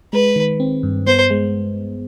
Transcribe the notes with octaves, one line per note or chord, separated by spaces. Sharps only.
G#3 B4
D#3
C4
G2
B3 C5
G#3